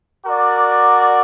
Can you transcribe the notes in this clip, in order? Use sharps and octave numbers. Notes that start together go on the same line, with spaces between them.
F#4 A#4 D5